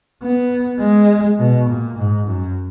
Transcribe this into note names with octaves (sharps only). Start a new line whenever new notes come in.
B3
G#3
B2
A#2
G#2
F#2